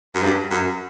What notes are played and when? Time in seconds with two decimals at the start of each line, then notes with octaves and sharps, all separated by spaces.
0.15 F#2
0.22 G2
0.51 F#2